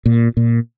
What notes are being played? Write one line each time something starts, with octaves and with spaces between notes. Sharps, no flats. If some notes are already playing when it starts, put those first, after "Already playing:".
A#2
A#2